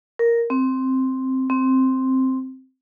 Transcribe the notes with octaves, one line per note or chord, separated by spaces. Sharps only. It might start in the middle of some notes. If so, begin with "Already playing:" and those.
A#4
C4
C4